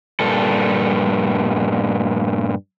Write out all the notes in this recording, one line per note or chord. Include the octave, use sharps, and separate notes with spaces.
G2 A#2 A4